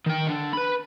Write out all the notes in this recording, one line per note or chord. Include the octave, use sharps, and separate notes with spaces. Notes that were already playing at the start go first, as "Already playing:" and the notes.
D#3 G5
D3 D4
B4 B5